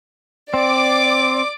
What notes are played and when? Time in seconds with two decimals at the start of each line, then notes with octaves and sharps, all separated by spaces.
0.54 C4 D5 D6